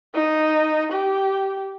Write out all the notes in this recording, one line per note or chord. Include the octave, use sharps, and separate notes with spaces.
D#4
G4